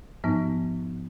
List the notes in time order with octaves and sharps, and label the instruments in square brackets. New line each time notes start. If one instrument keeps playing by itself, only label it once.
[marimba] G#2 F3 B3 D#4